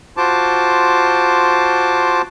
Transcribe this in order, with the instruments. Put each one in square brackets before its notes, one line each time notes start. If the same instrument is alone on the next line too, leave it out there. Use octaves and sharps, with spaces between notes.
[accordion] F4 F#4 C5 A5 D6